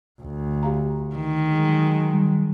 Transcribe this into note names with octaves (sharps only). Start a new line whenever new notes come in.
D2
G4 F5 A#5
D#3
F#3 G#3
D#3 G3